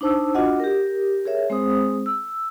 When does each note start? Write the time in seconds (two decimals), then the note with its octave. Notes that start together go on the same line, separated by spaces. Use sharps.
0.01 D4 D#4 C5 A5 E6
0.35 D4 F4 F#4 D#5 F#5
0.60 G4 A#4
1.25 G#4 A#4 C#5 E5
1.50 G#3 C4 G#4 C5 D#6
2.06 E6